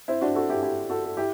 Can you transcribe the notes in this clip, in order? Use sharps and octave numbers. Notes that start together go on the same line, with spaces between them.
C4 E4
D4 F#4
F#4 A4
E4 G4
E4 G4
F#4 A4
A4
E4 G4